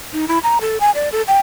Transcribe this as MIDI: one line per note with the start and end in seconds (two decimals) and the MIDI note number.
0.13 0.28 63
0.28 0.39 64
0.43 0.58 82
0.61 0.78 69
0.80 0.91 80
0.95 1.09 74
1.12 1.22 69
1.28 1.40 79